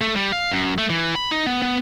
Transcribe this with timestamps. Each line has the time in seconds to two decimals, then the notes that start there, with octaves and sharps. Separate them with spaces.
0.01 A3
0.16 G3
0.32 F5
0.52 F#2
0.78 A3
0.90 E3
1.15 B5
1.31 D#4
1.46 B3
1.62 B3